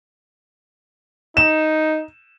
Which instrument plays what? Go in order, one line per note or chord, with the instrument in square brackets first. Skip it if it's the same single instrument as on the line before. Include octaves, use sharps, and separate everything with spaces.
[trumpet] D#4 [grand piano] E7